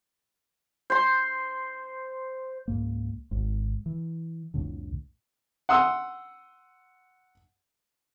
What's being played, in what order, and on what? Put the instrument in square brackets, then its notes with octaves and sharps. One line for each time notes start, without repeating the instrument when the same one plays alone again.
[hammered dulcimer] C5 C6
[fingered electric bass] C#2 G#2 A#3
G#1 G#2
E3
C2 F2 A2 D3
[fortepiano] F#5 C6 D#6 E6